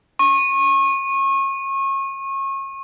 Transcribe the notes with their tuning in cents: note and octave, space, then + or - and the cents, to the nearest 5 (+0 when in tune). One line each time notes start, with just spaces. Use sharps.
C#6 -30